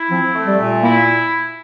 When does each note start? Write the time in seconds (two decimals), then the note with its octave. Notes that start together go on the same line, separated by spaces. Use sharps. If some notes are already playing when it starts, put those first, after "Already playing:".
Already playing: E4
0.10 F3 C4
0.34 A3
0.47 G3
0.58 A#2
0.82 A#3 E4